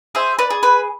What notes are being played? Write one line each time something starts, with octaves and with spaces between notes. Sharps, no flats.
G#4 C5 E5
B4 D5
G#4
B4